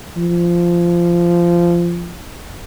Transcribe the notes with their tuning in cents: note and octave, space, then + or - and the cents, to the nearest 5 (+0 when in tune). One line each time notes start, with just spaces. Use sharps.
F3 -15